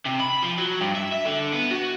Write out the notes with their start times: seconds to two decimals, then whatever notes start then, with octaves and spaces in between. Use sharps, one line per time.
0.05 C3
0.20 B5
0.42 F3
0.58 F#3
0.81 G2
0.96 E5
1.13 E5
1.25 D3
1.53 B3
1.71 F#4